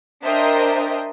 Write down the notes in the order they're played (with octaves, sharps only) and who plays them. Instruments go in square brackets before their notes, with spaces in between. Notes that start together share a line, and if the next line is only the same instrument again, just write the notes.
[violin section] D4 A#4 C5 D#5 E5 G5